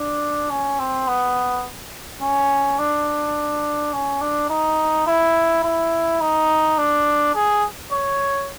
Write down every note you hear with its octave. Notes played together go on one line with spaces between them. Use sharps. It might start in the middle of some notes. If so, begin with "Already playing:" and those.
Already playing: D4
C#4
C4
B3
C#4
D4
C#4
D4
D#4
E4
E4
D#4
D4
G#4
C#5